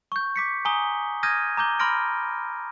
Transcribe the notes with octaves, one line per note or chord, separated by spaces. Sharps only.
C#6 G6
D6 B6 C#7
G#5 A#5 D#6 G7
D#6 F6 G6 G#6 A#6 D#7
A#5 D6 G6 G7
B5 C6 F6 A#6 D7